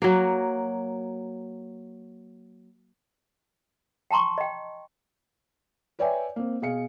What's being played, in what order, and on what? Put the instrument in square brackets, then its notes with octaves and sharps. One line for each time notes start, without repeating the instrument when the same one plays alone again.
[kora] F#3 A#3
[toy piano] G5 A5 A#5 C6 C#6
D#5 G5
[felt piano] B4 C#5 D5 E5 G5 G#5
A#3 C4
B2 G#4 F5 C#7